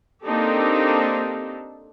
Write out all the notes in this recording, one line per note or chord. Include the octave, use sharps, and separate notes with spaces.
A#3 C4 D4 D#4 G4 A4